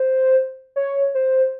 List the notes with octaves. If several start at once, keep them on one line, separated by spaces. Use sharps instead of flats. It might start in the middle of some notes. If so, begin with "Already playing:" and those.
Already playing: C5
C#5
C5